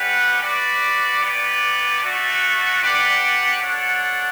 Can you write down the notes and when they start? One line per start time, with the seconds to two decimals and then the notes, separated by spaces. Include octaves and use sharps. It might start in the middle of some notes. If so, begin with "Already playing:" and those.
Already playing: G3 C#4 G4 B4 F#5
0.42 F#4 B4 D5
1.21 B3 D4 G4 D5
2.01 A3 D4 F#4
2.82 D4 G4 B4 D5 F#5
3.61 D4 A4 C#5 F#5